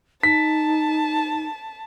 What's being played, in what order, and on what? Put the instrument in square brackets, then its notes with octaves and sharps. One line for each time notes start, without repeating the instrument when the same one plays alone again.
[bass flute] D#4 [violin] A5 [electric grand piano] B6